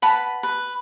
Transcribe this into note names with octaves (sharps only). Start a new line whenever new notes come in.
B4 F#5 A5 B5
B4